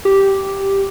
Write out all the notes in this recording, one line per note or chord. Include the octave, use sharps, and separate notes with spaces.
G4